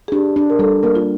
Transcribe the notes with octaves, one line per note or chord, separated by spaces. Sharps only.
G#4
D4 G4
D4
A#4
G3 A4
A#3 A#4
F4